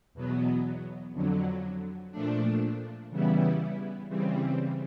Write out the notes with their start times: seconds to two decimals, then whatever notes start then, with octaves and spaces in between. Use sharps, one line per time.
0.14 E2 B2 F#3 B3
1.12 F2 D3 F#3
2.12 A#2 F3 A3 D4
3.11 C#3 E3 G3 B3 E4
4.09 C#3 E3 G3 C4